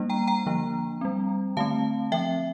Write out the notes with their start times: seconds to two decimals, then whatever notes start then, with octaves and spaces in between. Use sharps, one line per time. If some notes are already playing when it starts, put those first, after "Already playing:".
Already playing: G3 A#3 D4
0.10 G5 A#5
0.27 G5 A#5
0.46 D3 F3 A#3 D4
1.01 G3 C4
1.57 D3 A3 C4 F5 A5
2.12 F3 C4 E5 G5